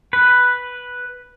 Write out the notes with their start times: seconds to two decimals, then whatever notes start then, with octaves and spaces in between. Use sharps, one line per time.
0.13 B4